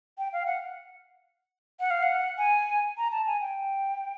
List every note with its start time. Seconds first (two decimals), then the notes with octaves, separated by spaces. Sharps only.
0.18 G5
0.33 F5
0.47 F#5
1.80 F#5
1.91 F5
2.03 F#5
2.38 G#5
2.98 A#5
3.12 A5
3.27 G#5
3.41 G5